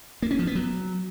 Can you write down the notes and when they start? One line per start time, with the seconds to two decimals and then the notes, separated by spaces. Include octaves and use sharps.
0.22 A#3
0.31 C#4
0.39 F3
0.47 B3
0.55 F#3